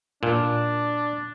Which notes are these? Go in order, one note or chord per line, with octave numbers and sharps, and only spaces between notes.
A#2 D4